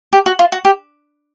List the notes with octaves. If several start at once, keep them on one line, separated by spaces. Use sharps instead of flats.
G4
F#4
F4
F#4
G4